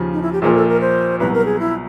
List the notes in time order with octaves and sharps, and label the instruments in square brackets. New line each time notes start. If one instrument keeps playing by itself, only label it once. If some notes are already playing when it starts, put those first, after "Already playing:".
Already playing: [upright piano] D#2 C#3 F3
[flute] D#4
E4
G4
[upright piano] A#1 A#2 F3 A#3 [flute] G#4
[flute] A4
A#4
C5
[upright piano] C2 B2 F#3 [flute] B4
[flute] A#4
G#4
E4